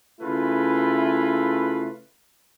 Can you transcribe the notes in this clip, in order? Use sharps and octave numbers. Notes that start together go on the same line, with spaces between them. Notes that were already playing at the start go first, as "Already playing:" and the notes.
C#3 A3 E4 F4 B4